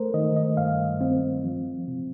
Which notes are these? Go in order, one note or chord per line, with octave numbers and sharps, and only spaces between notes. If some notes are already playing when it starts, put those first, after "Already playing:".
Already playing: A3 A#4 C5
D#3 D#5
D#5
G2 F5
C4
F3
C3